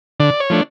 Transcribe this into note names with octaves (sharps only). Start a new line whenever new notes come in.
D3 D5
C#5
F3 A3 D4